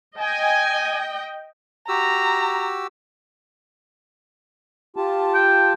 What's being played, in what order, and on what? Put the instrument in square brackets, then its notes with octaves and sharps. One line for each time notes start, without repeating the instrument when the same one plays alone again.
[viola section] D#5 G5 [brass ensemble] G#5
[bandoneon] F#4 G4 E6 [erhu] A#5
[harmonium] F4 G4 A5
[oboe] G5